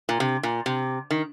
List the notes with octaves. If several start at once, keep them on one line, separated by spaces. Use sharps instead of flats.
A#2
C3
A#2
C3
D#3